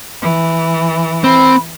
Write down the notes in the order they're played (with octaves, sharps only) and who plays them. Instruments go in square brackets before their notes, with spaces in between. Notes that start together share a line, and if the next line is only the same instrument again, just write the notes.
[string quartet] E3
[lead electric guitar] C4 [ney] B5